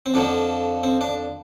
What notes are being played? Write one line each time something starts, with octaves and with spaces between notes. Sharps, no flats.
C4
F2 D3 F3 A#3 D4
C4
D4